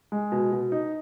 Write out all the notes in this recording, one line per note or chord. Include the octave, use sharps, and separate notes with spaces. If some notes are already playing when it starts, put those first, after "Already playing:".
G#3
B2
B2
D#4